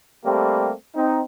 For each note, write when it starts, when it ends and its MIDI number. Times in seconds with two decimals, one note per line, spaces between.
0.25 0.72 55
0.25 0.72 57
0.25 0.72 58
0.25 0.72 60
0.25 0.72 67
0.96 1.21 60
0.96 1.21 63